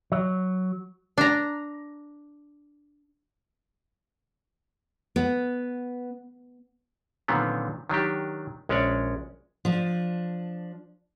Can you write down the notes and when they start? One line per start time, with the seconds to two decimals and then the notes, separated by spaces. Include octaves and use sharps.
0.12 F#3
1.18 D4 A#5
5.16 B3
7.28 A#2 D3 D#3 F#3 B3 C4
7.89 D#3 F#3 D4 G4
8.69 A#1 G#3 C#4 C#5 D5
9.65 F3 D4